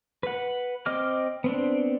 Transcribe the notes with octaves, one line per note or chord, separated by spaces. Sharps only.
B4 F#5
C4 D#5 D6 F6
B3 C4 D4